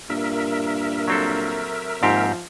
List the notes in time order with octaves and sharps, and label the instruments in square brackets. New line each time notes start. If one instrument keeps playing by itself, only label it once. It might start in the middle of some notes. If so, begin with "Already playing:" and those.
[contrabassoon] G2 [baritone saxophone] A#2 [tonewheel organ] A#4 E5
[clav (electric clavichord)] F#3 C4 A4
[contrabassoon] D#2 [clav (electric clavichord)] G#2 C4 G4 [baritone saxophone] F3